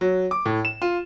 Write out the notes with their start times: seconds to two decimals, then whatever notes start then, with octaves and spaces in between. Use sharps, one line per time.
0.01 F#3
0.31 D6
0.46 A2
0.65 E7
0.82 F4